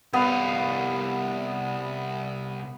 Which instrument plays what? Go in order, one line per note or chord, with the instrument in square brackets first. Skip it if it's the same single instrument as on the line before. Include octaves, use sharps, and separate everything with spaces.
[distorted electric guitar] C2 F5 [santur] B3